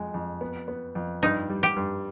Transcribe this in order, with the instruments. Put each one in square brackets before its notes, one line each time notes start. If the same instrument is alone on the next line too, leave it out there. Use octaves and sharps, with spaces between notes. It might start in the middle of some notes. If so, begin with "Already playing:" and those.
Already playing: [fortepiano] F2 G#3
F2
B3
B3
F2
[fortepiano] G2 [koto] D#4
[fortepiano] G3
[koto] G4
[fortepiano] G2